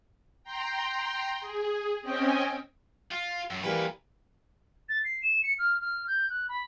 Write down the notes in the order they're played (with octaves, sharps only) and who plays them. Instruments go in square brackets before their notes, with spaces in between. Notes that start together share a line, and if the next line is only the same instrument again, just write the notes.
[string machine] G5 A#5 C6
G#4
C4 C#4 D#5 G5 G#5
[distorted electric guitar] F4
F#2 A2
[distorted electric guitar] D#2 B4 [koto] E3 G3 A#3
[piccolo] A6
C7
E7
C#7
F6
F6
G6
F#6
B5